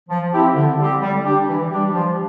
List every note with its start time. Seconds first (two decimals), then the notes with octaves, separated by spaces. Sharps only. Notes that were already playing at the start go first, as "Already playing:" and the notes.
0.09 F3
0.32 C4 E4 G4
0.55 D3
0.78 G3 C4 G4
1.01 G3
1.24 D4 G4
1.47 E3
1.70 G3 D4 G4
1.93 F3